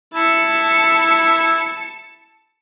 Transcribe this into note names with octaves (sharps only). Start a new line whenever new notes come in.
E4 A5 C#7